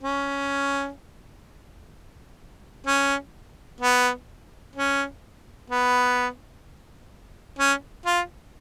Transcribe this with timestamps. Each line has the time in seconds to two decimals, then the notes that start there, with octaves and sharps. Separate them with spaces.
0.03 C#4
2.87 C#4
3.81 B3
4.75 C#4
5.70 B3
7.59 C#4
8.06 F4